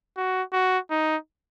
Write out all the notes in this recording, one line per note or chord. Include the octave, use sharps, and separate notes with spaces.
F#4
F#4
D#4